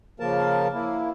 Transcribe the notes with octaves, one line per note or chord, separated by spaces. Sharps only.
C#3 F3 A#3 A#4 A5
A#3 E4